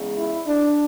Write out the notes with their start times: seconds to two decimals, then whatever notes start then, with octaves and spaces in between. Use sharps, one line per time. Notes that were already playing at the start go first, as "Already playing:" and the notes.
Already playing: E2 C#3 G#3
0.16 E4
0.47 D4